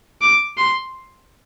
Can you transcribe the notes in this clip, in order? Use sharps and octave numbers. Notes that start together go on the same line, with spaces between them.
D6
C6